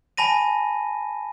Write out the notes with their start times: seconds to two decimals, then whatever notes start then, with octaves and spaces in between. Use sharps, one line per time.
0.17 G#5 A5 B5 A#6 D#7